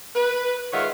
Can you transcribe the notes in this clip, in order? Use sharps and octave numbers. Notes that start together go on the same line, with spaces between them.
B4
D#3 G#3 F4 C#5 E5 F#5